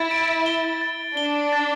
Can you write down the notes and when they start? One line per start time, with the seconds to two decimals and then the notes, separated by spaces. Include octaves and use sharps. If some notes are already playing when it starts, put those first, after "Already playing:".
Already playing: E4 A6
0.11 D7
0.46 G7
0.81 A6
1.17 D4 G7
1.52 A6